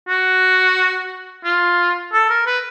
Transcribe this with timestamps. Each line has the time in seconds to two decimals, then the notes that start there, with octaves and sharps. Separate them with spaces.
0.09 F#4
1.44 F4
2.13 A4
2.30 A#4
2.46 B4